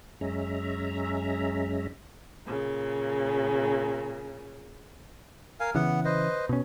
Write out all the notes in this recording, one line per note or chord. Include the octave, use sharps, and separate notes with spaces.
F#2 G#3 C#4 E5 A#5
A#2 C#3
A#4 F5 G#5
C#3 E3 B3 F#5
B4 C5 D#5
B2 C#4